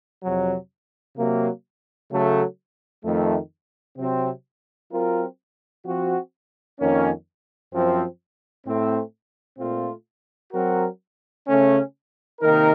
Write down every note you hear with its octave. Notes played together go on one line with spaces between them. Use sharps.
F2 C3 F#3
C3 F#3 A#3
C#3 F#3 A3
F2 D#3 A3
C3 F#3 C4
F#3 C4 F4 A#4
F3 C4 F#4
F2 D#3 A#3 C#4
F#2 F3 C4
A2 A3 C4
A#2 A3 C4 F4
F#3 C4 F#4 A#4
C#3 A3 C#4
C3 D#3 A#3 D#4 A#4